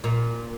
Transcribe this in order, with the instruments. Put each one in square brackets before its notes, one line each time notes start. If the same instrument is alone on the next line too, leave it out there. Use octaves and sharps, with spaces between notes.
[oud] A#2